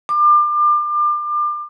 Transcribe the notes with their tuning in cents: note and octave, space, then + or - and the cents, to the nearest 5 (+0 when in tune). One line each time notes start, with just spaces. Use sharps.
D6 +30